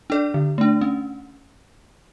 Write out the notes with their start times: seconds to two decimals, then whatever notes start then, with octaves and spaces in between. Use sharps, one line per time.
0.10 D4 A4 D5
0.34 D3
0.58 A3 D4
0.81 C#4